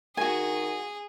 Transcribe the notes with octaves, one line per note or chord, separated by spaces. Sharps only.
D#3 F#4 G#4 G#5